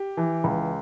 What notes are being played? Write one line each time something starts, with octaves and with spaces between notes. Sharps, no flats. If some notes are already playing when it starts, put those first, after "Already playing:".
Already playing: G4
E3
C#2